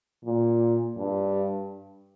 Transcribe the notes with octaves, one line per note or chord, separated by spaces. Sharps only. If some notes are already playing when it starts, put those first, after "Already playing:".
A#2
G2